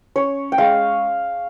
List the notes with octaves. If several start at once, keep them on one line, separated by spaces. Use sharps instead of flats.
C#4 C#5
G5
G#3 F5